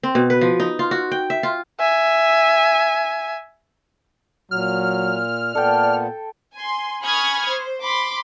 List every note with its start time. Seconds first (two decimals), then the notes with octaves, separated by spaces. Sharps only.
0.03 C4
0.15 B2
0.30 B4
0.41 F3
0.60 D#4
0.79 F4
0.91 F#4
1.11 G5
1.30 E5
1.43 F4
1.80 E5 G#5
4.51 A#2 F#3 F6
5.55 A#2 B3 A4 D5 G5
6.54 G#5 C6
7.03 G#5 B5 C#6 D#6 F6 G#6
7.49 C5
7.82 B5 C6 D6